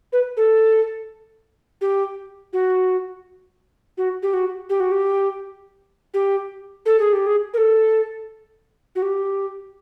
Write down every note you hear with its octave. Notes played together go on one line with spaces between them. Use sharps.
B4
A4
G4
F#4
F#4
G4
F#4
G4
F#4
G4
G4
A4
G#4
G4
G#4
A#4
A4
F#4
G4